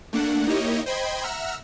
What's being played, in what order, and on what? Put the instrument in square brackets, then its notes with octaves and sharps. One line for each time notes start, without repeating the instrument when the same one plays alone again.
[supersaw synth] A3 A#3 D4 F#5
A#3 D#4 E4 G4 C#5 D#5
C5 D#5 G5 B5 C6 G#6
E5 F#5 A#5 E6 F6